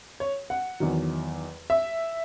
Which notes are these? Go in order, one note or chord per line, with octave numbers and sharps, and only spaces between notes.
C#5
F#5
E2 D#3 F#3
E5